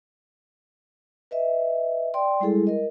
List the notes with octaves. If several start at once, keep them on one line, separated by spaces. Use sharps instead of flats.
B4 D#5 E5
D5 G5 C6
G3 G#3 E4 G#4 A4
A#4 D#5